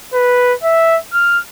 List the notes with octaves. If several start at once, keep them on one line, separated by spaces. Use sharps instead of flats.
B4
E5
F6